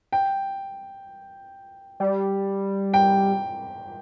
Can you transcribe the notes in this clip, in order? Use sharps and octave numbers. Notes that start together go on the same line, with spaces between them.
G5
G3
G5